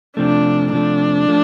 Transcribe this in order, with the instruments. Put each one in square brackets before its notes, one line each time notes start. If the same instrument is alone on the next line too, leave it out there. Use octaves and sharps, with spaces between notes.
[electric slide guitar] C3 F3 A3 [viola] D4
[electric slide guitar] C3 F3 A3 [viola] D4
[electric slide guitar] F3 A3